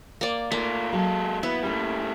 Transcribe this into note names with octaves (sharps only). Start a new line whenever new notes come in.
A#3 D5
A3 A#3 F4
F#3 G#3 A4
B3 E4
G3 A3 A#3 C#4